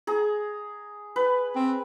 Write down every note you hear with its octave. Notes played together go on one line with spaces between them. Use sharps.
G#4 A#5
B4
C4